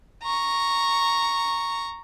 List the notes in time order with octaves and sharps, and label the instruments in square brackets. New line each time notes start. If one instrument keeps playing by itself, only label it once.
[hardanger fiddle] A#5 C#6